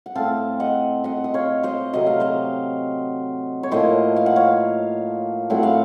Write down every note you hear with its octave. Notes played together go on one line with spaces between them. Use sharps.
F#5
A2 A3 C4 F5 A5
D#5 F#5
D#5 F#5
D#5
C#5 F5
C5 D#5
C3 F#3 A3 D#5
F5
C5 D#5
C#5
A2 F3 A#3 C5 D#5
F5
F#5
C#5 F5
A2 F#3 A3 C4 F#5
F5